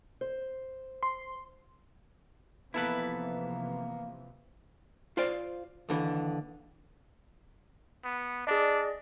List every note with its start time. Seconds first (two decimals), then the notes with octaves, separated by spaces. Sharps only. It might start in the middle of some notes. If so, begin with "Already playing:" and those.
0.21 C5
1.03 C6
2.74 C3 E3 F3 A#3 B3 E4 A4 B4
5.17 F4 C5 D5 F5
5.89 D#2 D3 E3
8.04 B3
8.47 D4 G#4 D5 D#5